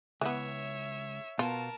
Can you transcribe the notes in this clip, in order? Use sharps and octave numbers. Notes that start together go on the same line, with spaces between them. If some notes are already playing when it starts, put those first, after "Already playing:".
C#2 E3 B3 C#5 E5
B2 F4 A#4 A5